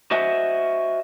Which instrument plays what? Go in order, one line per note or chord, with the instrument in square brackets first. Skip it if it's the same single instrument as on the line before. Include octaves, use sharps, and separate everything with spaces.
[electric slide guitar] F#4 C5 D#5 E5 F#5 G#5